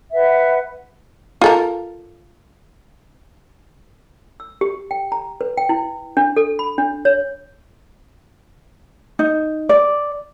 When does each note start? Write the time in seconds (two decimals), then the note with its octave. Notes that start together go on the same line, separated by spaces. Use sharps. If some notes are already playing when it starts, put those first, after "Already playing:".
0.13 B4 E5 F#5
1.41 F4 A4 A#4
4.40 E6
4.61 G4
4.91 G5
5.12 A#5
5.41 B4
5.57 G5
5.69 E4
6.17 D4
6.37 A4
6.59 B5
6.78 D4
7.05 C#5
9.19 D#4
9.69 D5